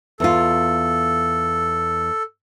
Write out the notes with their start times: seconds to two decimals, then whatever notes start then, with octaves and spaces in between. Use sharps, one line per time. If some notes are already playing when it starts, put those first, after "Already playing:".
0.20 E2 F4 A4